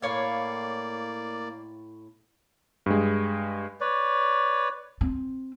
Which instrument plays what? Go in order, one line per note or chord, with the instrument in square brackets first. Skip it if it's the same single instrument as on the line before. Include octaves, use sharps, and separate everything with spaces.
[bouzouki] A2 C#5 F5 [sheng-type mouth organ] A#3 D5
[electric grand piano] G2 G#3
[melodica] B4 C#5 D5
[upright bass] C4